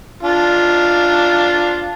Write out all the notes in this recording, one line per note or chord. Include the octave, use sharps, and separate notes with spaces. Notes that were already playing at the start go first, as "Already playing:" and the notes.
D4 F4